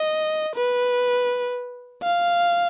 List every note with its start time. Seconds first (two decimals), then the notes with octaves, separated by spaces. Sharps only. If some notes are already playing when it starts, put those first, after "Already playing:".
Already playing: D#5
0.56 B4
2.03 F5